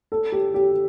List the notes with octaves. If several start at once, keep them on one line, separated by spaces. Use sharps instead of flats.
A4
G4
G4